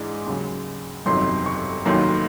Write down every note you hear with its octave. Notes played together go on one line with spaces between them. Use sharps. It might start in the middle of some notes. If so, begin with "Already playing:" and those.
Already playing: G#2 E3 G#3 D4
D#2 C#3 F#3
G1 F2 C3 D#3 F#3 C6
C#6
F1 D#2 D#3 F#3 A#3 C6